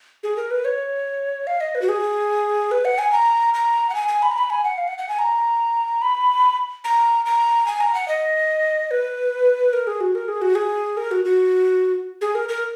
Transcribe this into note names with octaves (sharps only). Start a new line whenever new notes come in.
G#4
A#4
B4
C#5
F5
D#5
B4
F#4
G#4
B4
F#5
G#5
A#5
A#5
F#5
G#5
G#5
B5
A#5
B5
G#5
F#5
F5
F#5
F#5
G#5
A#5
B5
A#5
A#5
G#5
A#5
F#5
D#5
B4
A#4
G#4
F#4
A#4
G#4
F#4
G#4
A#4
F#4
F#4
G#4
A#4
A#4